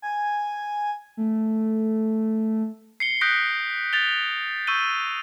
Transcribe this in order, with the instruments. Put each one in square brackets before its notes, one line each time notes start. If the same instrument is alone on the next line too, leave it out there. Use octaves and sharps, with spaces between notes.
[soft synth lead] G#5
A3
[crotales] C7 C#7 G7
D#6 F#6 G6 A#6 B6 D7
G6 A6 F7 G7
C#6 E6 G6 D#7 G7